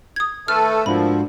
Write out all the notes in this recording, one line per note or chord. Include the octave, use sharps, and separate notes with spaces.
D#6 G#6
D#3 A3 A4 B4 A5 F6
G#2 F3 A3 A#3 D4 E4 F#4 B5